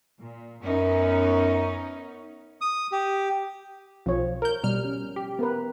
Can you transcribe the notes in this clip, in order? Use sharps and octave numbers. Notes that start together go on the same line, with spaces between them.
A#2
F#2 B3 C#4 D#4
D#6
G4
B1 F3 C4 C#5
A#4 G6
B2 G3 F6
C#4
G4
B3 A#4 B4